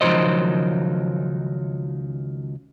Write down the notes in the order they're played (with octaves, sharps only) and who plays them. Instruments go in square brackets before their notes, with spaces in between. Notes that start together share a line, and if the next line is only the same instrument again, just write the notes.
[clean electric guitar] C#2 D#3 F3 F#3 C5 D#5